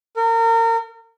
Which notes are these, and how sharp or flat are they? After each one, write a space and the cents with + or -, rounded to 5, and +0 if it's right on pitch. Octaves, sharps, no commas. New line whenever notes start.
A#4 -30